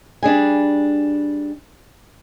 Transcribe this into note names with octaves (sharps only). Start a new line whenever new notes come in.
G3 D4 G#4 G#5